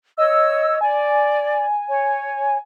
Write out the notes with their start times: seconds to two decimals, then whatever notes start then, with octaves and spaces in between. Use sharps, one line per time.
0.18 C#5 D#5 E6
0.81 D5 G#5
1.88 C#5